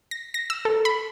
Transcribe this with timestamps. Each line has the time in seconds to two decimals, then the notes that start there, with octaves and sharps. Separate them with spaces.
0.11 A#6
0.34 A#6
0.50 E6
0.65 A4
0.85 B5